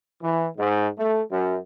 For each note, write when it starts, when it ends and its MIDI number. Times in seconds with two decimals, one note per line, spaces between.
0.22 0.47 52
0.58 0.87 44
0.98 1.20 57
1.30 1.57 42